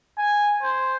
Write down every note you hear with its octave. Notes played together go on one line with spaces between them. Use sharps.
G#5
C5